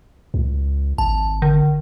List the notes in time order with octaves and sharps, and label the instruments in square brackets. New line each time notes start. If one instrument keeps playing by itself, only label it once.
[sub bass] C#2
[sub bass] G#1 [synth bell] A5
[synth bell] D3